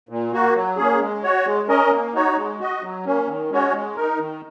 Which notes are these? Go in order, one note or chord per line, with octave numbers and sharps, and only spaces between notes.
A#2
A#3 F#4
F#3
A#3 C#4 G#4
G#3
F#4 C#5
G#3
C#4 A#4 D#5
A#3
D#4 F#4 C#5
G#3
F#4 D#5
F#3
A#3 C#4
D#3
G#3 C#4 F#4 C#5
G#3
D#4 A#4
D#3